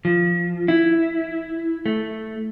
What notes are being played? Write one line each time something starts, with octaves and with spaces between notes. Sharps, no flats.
F3
E4
A3